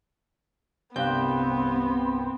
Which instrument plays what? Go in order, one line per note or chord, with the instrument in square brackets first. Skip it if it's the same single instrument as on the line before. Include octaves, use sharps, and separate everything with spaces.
[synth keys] C2 G2 G6 [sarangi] B3 [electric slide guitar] C4 [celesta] D5 F5 F#6